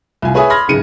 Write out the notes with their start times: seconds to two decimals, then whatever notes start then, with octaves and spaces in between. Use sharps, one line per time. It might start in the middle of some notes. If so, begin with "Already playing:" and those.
0.22 C2 F4 G#5
0.34 G#4 B4 C#5 E5 G#5 D#6
0.50 B5 C6 F6 G#6 A#6
0.68 D1 G#2 C#3 C#7 D#7